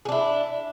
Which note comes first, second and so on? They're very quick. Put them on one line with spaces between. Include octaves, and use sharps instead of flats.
G#4 D4 E4